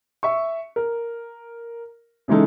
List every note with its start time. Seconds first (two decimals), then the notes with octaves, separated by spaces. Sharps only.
0.23 E5 C#6
0.76 A#4
2.28 C#3 E3 G#3 D#4 A4